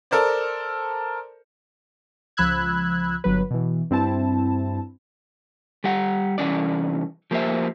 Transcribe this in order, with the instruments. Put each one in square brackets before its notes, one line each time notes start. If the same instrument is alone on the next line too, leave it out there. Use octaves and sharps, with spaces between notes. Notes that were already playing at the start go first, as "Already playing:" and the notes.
[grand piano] A4 A#4 C5 D5
[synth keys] C#2 F3 B5 E6 F#6 G#6
G1 F#3 B4
B2 E3
G2 C4 E4 A5
[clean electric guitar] G3 G4 F#5
C2 E3 C#4 D5
F3 A#3 G4 B4 C5 E5